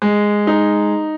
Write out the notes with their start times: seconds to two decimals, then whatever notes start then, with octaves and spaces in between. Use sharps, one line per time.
0.02 G#3
0.47 D#4